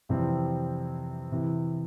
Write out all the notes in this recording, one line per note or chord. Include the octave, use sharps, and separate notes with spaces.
F2 C3 E3 G3 C4
C3 E3